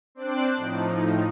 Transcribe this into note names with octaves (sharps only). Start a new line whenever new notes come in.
C4 D4 C5 D6 F#6
A2 F3 D#4